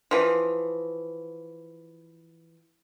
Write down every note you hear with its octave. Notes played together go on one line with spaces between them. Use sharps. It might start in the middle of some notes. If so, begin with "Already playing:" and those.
E3 F3